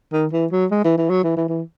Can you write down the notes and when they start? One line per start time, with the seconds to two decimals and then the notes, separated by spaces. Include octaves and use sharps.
0.13 D#3
0.33 E3
0.52 F#3
0.71 G#3
0.84 E3
0.98 E3
1.10 F#3
1.24 E3
1.37 E3
1.49 E3